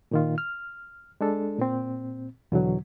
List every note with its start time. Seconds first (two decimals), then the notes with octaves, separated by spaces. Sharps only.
0.11 A#2 D#3 F4
0.38 F6
1.21 G#3 D4 A4
1.59 A#2 C4
2.52 E2 B2 D3 F#3